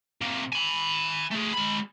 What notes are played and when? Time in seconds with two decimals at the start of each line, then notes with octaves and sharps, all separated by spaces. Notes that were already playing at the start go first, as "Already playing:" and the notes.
0.22 C3 A#3
0.53 G#5 B5
1.32 A3 G#4
1.54 G#3 B5